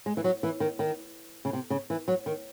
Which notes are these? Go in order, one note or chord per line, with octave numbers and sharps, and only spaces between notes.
G#3
E3
F#3
E3
D#3
D#3
C#3
C3
C#3
E3
F#3
D#3